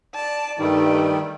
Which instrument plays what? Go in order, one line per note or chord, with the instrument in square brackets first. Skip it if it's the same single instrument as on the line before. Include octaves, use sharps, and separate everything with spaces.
[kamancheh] D5 A5
[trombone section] G2 D#4 [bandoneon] D#3 G3 [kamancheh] A3 D5